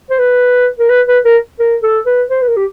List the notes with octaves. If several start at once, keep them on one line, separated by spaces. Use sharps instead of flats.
C5
B4
A#4
B4
B4
A#4
A#4
A4
B4
C5
B4
A#4
G4